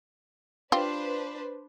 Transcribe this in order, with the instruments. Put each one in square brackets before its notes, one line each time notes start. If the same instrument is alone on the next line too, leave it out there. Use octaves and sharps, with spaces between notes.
[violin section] D4 B4 C5 [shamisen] F4 G4